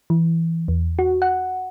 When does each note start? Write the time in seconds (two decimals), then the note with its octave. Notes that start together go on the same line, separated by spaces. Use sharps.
0.10 E3
0.68 E2
0.99 F#4
1.22 F#5